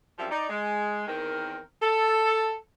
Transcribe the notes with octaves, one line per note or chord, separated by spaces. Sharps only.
F#2 F3 G3 C4 G4 E5
D#4 D5
G#3
E2 D#3 C4 A#4
A4